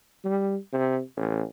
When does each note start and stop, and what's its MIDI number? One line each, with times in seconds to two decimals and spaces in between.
0.25 0.56 55
0.73 0.99 48
1.16 1.43 33